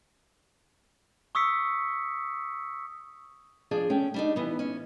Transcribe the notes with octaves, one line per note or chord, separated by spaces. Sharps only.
C#6 D#6 E6 B6 C#7
F3 D4 G#4
A3 C#4 G5
G3 D4 D#4
E3 B3
C#4